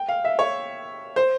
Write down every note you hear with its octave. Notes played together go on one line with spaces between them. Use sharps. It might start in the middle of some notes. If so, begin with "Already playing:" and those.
Already playing: G5
F5
E5
C#5
C5